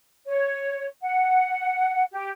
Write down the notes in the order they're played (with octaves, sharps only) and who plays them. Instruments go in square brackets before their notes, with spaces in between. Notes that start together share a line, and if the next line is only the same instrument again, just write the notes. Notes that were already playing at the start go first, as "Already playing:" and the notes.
[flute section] C#5
F#5
G4